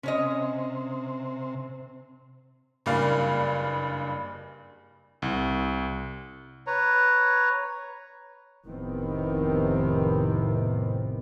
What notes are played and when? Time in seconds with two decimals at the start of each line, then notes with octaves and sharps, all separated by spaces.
0.03 C3 C#4 C#5 D#5
2.86 F#1 G2 D5 F5
5.22 C2
6.67 B4 C#5 A#5
8.65 F1 A2 C3 D#3 B3 C4